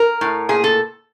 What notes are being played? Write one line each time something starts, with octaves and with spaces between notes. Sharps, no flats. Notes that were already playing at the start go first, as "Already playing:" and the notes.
Already playing: A#4
A2
A#2 G#4
A4